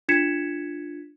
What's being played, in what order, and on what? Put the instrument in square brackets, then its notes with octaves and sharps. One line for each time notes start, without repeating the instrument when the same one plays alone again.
[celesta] D4 F4 G#6 B6 C#7 E7